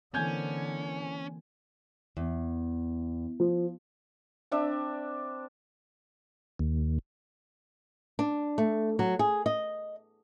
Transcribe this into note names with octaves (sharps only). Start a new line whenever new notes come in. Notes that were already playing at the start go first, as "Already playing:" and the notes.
D3 E3 A#3 C4 C#4 G#5 G6 G#6
E2
F3
C4 D4 E5
D#2
D4
A3
F#3
G#4
D#5